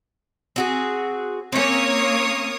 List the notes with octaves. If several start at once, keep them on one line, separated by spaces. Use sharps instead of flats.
C4 F#4 G#4
A#3 C4 C#4 C#5 D#6